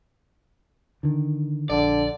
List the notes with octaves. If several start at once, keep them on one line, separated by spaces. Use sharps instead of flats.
D3 D#3
A#1 D3 D5